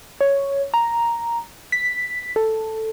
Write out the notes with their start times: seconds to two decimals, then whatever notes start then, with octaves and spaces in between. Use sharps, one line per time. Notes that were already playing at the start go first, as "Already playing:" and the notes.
0.21 C#5
0.74 A#5
1.72 B6
2.36 A4